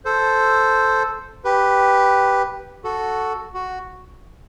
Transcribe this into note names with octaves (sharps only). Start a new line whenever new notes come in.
A4 C5
G4 B4
F#4 A4
F#4